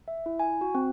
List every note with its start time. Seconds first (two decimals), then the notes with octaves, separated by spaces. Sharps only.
0.08 E5
0.26 E4
0.40 G#5
0.61 F#4
0.75 C4